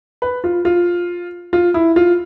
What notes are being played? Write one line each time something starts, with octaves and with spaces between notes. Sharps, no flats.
B4
F4
F4
F4
E4
F4